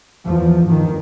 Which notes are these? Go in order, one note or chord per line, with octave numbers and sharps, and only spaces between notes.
E2 F3
G1 D#3